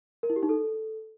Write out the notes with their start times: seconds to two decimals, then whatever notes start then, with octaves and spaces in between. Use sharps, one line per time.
0.23 A#4
0.30 E4
0.36 G4
0.43 D#4
0.49 A4